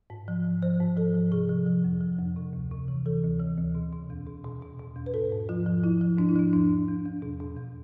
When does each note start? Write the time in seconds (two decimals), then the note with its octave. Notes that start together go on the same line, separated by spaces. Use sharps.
0.10 G#2
0.28 F3
0.45 F3
0.62 F3 C5
0.80 G#2
0.97 F3 A4
1.15 F3
1.32 C3 G#4
1.49 F3
1.67 F3
1.84 F2
2.01 F3
2.19 F2
2.36 C3
2.53 D2
2.71 C3
2.88 E3
3.06 E3 A4
3.23 D2
3.40 E3
3.58 D2
3.75 B2
3.93 B2
4.10 E2
4.27 B2
4.44 B2
4.62 B2
4.79 B2
4.96 E2
5.06 B4
5.14 G#2 A4
5.32 G#2
5.49 F3 F4
5.66 F3
5.84 F3 E4
6.01 F3
6.18 G#2 D4
6.29 E4
6.36 F3 D4
6.53 E2 D4
6.70 E2
6.88 E2
7.05 E2
7.22 B2
7.40 B2
7.57 E2